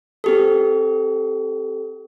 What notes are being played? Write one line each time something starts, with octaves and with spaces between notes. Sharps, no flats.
C4 G4 A4